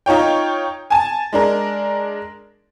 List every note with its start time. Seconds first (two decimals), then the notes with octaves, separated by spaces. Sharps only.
0.06 D#4 F4 C#5 G5
0.90 G#5 A5
1.33 G#3 D4 A#4